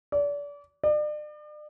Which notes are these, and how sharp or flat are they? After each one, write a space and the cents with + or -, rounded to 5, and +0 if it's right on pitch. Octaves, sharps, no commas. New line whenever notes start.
D5 -30
D5 +40